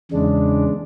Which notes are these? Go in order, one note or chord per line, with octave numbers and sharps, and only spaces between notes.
E2 C#3 G#3 D4